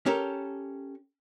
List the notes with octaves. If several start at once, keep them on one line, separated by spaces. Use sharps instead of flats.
C#4 G4 A4 A#4